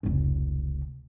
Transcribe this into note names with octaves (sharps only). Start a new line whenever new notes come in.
F1 C#2